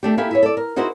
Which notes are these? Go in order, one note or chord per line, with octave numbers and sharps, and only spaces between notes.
A3 D4 G4
A#3 E4 G4 A4 F5 G#5
E4 G#4 C#5
A4 D5
A#4
D#4 E4 F#4 G#4 A#4 C5